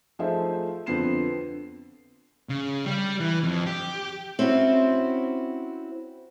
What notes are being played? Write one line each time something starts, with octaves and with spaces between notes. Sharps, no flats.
F3 A3 D#4 G#4 C5 E5
F2 D3 B3 C4 C7 E7
C#3
G3
E3
F2
G4
C4 C#4 E4 F#4